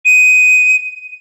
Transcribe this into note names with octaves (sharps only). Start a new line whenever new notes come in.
D#7